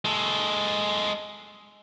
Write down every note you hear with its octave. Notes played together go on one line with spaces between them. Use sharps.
G#3 A4